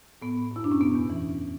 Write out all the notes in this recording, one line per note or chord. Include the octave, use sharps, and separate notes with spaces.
A2 B3
A2
F#2 E4
F#2 D4
C#4
B2 B3
E2
E3